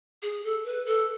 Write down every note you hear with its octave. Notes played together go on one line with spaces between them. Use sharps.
G#4
A4
B4
A4